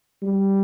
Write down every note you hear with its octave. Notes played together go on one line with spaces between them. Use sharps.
G3